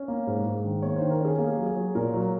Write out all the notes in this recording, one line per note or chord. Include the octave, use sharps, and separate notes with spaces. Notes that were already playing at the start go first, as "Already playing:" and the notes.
Already playing: C#4
A#3
G#2
G#2
D#3
A#3 C#5
C5
D#3
A#4
C#4 G#4
A#3 G#4
F#3
G#4
F#3
A#2 A#4
F#3